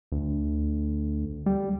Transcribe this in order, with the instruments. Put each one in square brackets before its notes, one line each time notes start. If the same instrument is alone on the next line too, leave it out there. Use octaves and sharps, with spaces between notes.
[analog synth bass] D2
G3